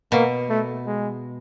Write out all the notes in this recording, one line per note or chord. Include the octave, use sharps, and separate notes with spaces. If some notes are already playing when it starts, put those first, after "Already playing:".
B2 A#3
A3
G#3